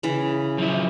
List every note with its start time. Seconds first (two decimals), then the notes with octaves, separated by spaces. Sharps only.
0.03 C#3 E3
0.58 F3 F#3 E4